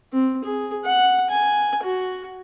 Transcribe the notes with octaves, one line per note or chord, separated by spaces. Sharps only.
C4
G#4
F#5
G#5
F#4